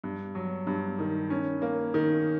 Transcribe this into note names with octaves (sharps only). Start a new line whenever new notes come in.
G2
F#3
G2
D#3
C#4
A#3
D#3